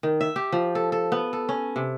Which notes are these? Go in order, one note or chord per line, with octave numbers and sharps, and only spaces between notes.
D#3
E5
G4
F3
A4
A4
B3
A4
C#4
C3